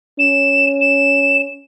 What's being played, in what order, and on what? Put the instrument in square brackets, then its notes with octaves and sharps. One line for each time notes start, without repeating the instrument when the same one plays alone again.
[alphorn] C#4 [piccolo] E7
[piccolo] E7